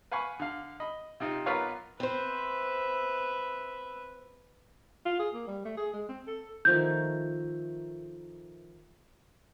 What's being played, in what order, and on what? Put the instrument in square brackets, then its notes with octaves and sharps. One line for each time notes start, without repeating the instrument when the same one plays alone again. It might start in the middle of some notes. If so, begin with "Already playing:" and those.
[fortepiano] B4 F5 F#5 G#5 B5 C#6
D3 F5
D#5 B5
C3 C4 D#4 F4
B1 F4 A#4 B4 C#5 F5
[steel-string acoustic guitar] C4 C5 [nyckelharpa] B4 E5
[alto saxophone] F4
G#4
A#3
G3
A3
G#4
G#3
C4
A4
[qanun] D#3 F3 A3 [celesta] G6